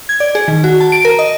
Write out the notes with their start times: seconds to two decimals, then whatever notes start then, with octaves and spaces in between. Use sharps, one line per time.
0.09 G#6
0.20 D5
0.35 G#4
0.48 D#3
0.64 F#4
0.80 A5
0.92 D7
1.05 A#4
1.19 D#5